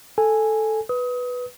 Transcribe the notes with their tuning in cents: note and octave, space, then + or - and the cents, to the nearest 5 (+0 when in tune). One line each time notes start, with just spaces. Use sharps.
A4 +0 G#5 +0
B4 +0 D#6 +25